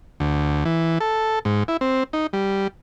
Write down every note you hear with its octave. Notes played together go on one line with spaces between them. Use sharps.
D2
E3
A4
G#2
E4
C4
D#4
G3